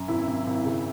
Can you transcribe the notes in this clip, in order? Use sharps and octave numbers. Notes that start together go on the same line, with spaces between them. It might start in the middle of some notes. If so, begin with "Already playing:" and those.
Already playing: F#2
G#1 E4
G#1
G#1
C#3